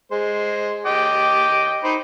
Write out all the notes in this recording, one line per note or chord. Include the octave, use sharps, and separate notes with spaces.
G#3 C5
D#5 G5 D6
D#4 C5 B5